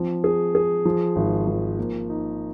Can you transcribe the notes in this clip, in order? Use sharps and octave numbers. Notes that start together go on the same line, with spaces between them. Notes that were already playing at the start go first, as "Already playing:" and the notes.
Already playing: F3 C4
G#4
G#4
F3
G#1
F3
A#3
D#4